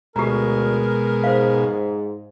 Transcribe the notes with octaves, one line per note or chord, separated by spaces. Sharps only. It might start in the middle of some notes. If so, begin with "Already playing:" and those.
D2 B2 G#3 G4 A#4 A#5
G#2 C5 F5